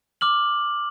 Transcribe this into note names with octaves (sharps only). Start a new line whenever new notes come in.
D6 F6 F#7